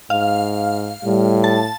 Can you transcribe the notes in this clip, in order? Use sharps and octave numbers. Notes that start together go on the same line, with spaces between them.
G#2 F5
A2 G3
A5